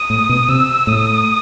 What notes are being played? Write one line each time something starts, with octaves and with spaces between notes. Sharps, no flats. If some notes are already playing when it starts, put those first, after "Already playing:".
Already playing: D#6
A2
B2
C3 E6
A2 D#6